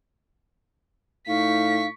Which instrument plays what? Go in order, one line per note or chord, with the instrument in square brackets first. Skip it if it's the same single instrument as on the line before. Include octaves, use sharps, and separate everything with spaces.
[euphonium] A2 [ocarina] D#4 [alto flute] F5 [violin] C#6 B6